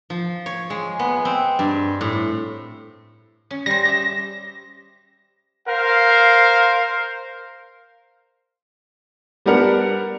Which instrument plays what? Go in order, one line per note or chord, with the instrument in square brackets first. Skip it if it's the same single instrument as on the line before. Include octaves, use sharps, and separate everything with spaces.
[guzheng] F3
C#5
G#3
B3
C4
G2
A2
C#4
[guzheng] G3 C5 [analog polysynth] A#6
[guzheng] G4 E5
[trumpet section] A#4 C5 F5
[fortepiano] G3 B3 D4 A#4 F#5